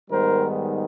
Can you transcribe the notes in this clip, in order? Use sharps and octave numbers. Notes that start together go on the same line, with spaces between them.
G#2 D#3 G3 B3 A#4 C5